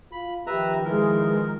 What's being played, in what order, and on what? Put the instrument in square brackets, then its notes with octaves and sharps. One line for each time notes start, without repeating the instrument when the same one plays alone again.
[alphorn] F4 [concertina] B5
[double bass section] D#3 F3 [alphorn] G4 [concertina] B4 E5 A#5
[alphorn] E3 [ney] G#3 [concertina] A#4